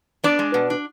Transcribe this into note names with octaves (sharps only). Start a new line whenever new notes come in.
B3 D4 D5
G#3
B2
D4